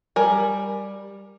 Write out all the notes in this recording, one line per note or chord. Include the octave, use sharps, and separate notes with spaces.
G3 A#4 G#5